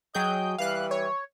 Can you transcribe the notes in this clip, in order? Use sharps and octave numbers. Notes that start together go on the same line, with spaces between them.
F#3 G#4 D#5 G5 G6
E3 G3 F5 F#6
C#5